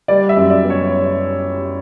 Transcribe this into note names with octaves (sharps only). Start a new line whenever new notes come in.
G3 D5
E5
F#2
D5
B3
C#5